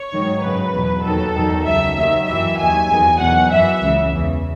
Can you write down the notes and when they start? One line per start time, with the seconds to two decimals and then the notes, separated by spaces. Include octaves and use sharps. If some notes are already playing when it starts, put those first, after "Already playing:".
Already playing: C#5
0.12 G#2 D#3 F#3
0.43 F#2 C#3 F#3 B4
0.74 E2 B2 F#3
1.04 D#2 D#3 F#3 A4
1.36 E2 D#3 F#3
1.66 C#2 C#3 F#3 E5
1.98 D#2 D#3 F#3 E5
2.27 F#2 E3 E5
2.59 D#2 D#3 F#3 G#5
2.89 E2 D#3 F#3
3.20 E2 B2 F#3 F#5
3.51 F#2 E3 E5
3.81 C#2 C#3 E3
4.12 E2 C#3 E3